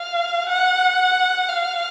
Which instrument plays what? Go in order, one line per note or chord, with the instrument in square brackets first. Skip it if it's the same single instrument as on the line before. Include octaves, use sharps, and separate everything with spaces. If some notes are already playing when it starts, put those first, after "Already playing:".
Already playing: [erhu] F5
F#5
F5